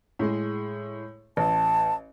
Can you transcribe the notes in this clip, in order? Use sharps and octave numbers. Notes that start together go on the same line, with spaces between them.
A2 G#3 G#4
A1 A5